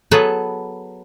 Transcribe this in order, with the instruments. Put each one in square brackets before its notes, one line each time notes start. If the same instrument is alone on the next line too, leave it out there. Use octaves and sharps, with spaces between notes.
[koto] F#3 B3 G#4 A4 B4